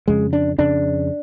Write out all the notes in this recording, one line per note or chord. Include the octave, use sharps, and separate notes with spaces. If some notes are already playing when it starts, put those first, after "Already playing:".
F2 C#3 G#3
D4
F2 C#3 D4